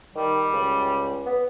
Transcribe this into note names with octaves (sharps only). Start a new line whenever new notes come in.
D#3 G3
C#2
B3